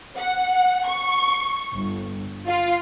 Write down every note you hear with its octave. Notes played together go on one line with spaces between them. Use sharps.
F#5
C#6
G1
F4